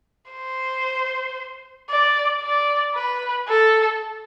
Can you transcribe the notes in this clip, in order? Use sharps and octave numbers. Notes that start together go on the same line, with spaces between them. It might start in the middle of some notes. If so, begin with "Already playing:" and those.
C5
D5
D5
B4
A4